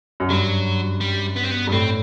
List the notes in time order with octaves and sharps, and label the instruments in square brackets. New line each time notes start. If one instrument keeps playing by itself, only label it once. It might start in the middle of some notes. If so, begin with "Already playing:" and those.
[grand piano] F#2
[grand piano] G2 [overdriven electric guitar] F#3
[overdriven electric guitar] G3
B3
C4
B3
[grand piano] G2
[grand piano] A2 [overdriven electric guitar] C4